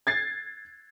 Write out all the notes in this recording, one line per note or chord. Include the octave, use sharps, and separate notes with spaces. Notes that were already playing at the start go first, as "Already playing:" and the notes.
G#6 A6 C7